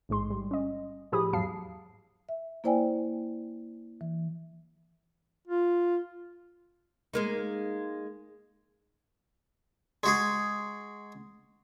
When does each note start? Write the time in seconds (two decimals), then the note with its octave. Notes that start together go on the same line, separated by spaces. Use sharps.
0.09 A1 G#2 G#3 C6
0.30 G3
0.51 C#4 D#5
1.12 A2 F3 G4 G#4 B5 D#6
1.33 E2 G#2 F#3 F5 A5 C7
2.29 E5
2.64 A#3 E4 C5 D5 G5 G#5
4.01 E3
5.48 F4
7.14 G#3 A#3 D#4
10.03 G#3 F#4 G#4